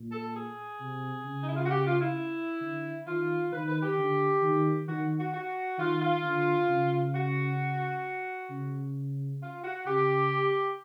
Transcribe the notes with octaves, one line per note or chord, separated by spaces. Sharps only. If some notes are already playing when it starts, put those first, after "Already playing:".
Already playing: A#2
A4
G#4
C3
C#3
D#4
E4
F4
F#4
G4
F4
E4
D3
D#3 F4
D#3 B4
B4
G4
D3
D#3
D#3 F#4
F#4
F#4
D#3 F4
F4
D3
C#3
F#4
C#3
F4
F#4
C#3 G4